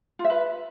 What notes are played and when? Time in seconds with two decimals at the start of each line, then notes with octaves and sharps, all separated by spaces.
0.19 F4
0.24 E5
0.30 B4